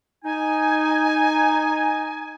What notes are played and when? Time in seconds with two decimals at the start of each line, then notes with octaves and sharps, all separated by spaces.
0.25 D#4 G#5